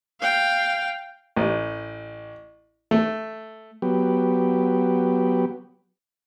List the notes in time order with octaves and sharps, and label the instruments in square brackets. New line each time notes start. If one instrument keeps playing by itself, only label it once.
[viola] F5 G5
[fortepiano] A1
A3
[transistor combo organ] F#3 B3 G4